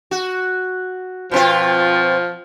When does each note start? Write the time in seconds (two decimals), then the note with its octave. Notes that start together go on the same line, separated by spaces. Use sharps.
0.11 F#4
1.31 B2 F3 C4 F4